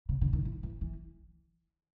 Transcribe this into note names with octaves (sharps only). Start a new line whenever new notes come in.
C#3
D3
D#3
E3
E3
E3